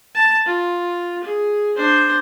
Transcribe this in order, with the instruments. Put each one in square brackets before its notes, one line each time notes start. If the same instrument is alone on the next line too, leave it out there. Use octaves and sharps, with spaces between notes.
[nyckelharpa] A5
F4
G#4
D4 C5